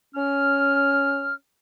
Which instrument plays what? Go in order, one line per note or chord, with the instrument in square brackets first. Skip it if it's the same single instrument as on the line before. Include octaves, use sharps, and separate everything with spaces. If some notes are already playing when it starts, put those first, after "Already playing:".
[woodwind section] C#4 F6